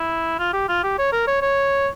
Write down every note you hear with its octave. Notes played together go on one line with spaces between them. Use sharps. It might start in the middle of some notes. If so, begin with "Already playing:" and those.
Already playing: E4
F4
G4
F4
G4
C#5
A#4
C#5
C#5